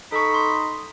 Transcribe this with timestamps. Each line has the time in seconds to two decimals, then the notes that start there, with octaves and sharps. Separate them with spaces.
0.12 D#4 A4 A5 B5 C#6
0.34 C6